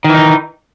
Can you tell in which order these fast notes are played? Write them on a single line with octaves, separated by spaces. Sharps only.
D#3 E3 D#4